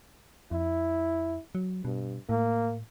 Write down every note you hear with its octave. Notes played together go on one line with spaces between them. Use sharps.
F2 E4
F#3
G2 B2
A2 A#3